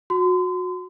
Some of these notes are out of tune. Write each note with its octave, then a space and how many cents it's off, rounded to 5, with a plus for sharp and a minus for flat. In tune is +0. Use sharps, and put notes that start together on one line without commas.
F#4 -25 C6 -35